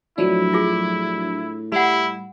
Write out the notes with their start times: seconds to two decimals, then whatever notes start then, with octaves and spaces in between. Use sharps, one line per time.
0.18 A2 F3 F#3 D4 E4
0.53 F4 G#4
1.72 G3 E4 F#5 B5